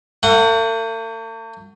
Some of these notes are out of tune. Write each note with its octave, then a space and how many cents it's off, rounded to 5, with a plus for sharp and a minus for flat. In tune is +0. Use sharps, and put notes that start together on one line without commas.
A3 +45 F#5 -5